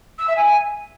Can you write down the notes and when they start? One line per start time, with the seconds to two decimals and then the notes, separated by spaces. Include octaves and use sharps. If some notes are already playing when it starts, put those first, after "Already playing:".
0.19 E6
0.28 E5
0.37 G#5